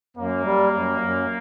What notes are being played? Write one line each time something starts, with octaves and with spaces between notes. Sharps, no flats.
F#2 A#3
G3
F#2
F#2